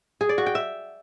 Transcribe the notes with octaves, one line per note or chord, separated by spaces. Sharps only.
G#4
D5
F#4
G5
E5